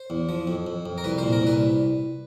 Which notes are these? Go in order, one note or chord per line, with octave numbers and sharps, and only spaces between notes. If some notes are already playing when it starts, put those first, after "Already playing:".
Already playing: C5
E2
F3
F2
F2
F2
A#4
C2 B4
A#2 C5
A#4
C2 B4